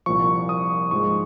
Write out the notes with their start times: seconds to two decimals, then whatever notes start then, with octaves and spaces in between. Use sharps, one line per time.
0.06 C2 A#2 F3 C#6
0.49 D#6
0.91 G#2 F3 G#3 C#6